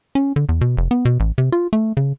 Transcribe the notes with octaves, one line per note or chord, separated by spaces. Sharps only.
C#4
D3
E2
B2
F1
B3
B2
A1
C3
F4
A3
C#3